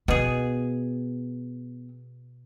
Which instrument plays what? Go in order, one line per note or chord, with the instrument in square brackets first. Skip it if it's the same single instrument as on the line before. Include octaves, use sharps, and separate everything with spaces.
[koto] B2 G#4 [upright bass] B3